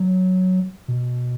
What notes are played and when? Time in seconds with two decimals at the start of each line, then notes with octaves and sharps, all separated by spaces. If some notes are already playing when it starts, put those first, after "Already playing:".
Already playing: F#3
0.88 B2